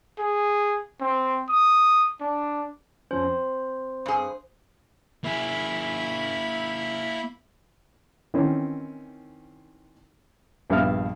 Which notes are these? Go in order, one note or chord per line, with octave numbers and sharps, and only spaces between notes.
G#4
C4
D#6
D4
F2 F3 C#4 C5
C4
G2 G#4
A#3 E4 G#4 E5 B5
D#3 E3 C4 C#4
A#1 G2 B3 E5 F5 F6